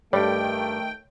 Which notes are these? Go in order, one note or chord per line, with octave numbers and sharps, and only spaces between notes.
G2 D#3 G3 A3 C#5 G5